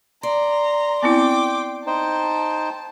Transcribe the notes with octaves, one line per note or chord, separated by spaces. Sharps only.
D5 A#5 C6
B3 C4 E4 G5 D6
D#4 C5 G5 A5